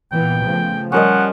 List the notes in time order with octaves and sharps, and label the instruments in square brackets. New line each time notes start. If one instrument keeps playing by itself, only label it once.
[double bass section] A#2 E3 B3 [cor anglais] G5
[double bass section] C#3 F3 A3
[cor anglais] F3 [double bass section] G3 [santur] C#4 A#4 D#5 [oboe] F#5